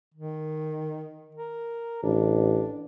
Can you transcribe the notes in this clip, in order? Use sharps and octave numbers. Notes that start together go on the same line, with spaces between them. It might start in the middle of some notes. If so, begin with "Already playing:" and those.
D#3
A#4
A1 D4